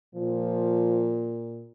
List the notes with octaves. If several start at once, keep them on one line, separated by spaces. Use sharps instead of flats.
A#2 F3